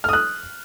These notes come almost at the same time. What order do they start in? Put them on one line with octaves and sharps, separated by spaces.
F6 D#6 F#6